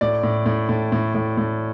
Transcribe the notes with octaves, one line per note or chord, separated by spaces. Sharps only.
A2 D5
A2
A2
A2
A2
A2
A2